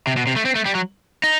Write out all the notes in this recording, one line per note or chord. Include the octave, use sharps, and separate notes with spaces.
C3
B2
C3
A3
C4
A3
G3
F#3
D#4